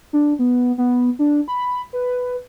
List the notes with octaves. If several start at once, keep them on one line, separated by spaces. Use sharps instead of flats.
D4
B3
B3
D4
B5
B4